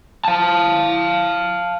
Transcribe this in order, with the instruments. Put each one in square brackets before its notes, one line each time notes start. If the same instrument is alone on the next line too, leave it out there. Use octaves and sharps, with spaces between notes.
[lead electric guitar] F5 A5